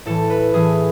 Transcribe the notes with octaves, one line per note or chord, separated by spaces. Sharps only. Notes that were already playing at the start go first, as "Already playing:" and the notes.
A2 E3 A4
B4
A2 E3 G#4